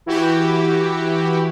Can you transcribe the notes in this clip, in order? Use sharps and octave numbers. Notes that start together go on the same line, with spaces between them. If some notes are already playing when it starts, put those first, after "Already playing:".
E3 E4 F#4 G4